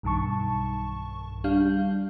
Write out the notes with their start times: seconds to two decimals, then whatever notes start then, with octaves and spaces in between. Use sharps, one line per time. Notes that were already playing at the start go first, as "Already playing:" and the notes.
0.03 B1 G2 D#3 A5 C#6
1.44 G3 D4 F5 G6